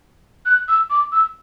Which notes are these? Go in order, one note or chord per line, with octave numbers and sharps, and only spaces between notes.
F#6
E6
D6
E6